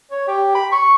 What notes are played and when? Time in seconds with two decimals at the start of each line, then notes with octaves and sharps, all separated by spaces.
0.12 C#5
0.28 G4
0.55 B5
0.72 C#6